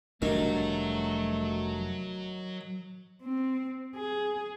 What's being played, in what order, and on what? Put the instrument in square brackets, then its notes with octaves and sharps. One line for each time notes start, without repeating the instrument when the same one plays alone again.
[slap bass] F1 G3 D4 [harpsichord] D#3 [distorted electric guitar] F#3 F#4 [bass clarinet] A3
[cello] C4
G#4